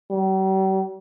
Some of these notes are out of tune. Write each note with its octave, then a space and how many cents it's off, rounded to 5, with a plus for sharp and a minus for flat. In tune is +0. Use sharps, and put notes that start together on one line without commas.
G3 -45